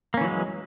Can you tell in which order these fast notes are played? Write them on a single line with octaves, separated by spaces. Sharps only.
A#3 C#4 E3 F#3 G#3